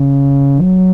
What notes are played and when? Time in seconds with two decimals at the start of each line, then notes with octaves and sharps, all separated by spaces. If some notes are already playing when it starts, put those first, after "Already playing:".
Already playing: C#3
0.61 F#3